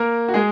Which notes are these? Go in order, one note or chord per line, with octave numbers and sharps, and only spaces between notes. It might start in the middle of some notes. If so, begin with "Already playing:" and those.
Already playing: A#3 A#4
F#4
G#3 G#4